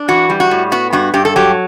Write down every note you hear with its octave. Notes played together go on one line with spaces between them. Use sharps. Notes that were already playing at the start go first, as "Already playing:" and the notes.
Already playing: D4
E3 F#4
G3
F#4
A2
B3 F#4
G2 F#4
G2 G4
A4
F#3 G4